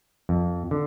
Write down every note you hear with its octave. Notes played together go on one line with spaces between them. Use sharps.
F2
D3